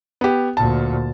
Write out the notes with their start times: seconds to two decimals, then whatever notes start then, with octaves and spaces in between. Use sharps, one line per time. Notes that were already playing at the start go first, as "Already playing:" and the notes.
0.21 B3 G4
0.57 D2 A#2 A5